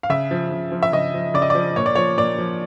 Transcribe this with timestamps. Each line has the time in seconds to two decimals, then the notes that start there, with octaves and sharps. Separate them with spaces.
0.03 F5
0.10 C#3 E5
0.31 F3
0.51 C#3
0.72 F3
0.83 E5
0.92 C#3 D#5
1.14 F3
1.34 C#3 D5
1.42 D#5
1.50 F3 D5
1.76 A#2 C#5
1.86 D5
1.95 F3 C#5
2.17 A#2 D5
2.38 F3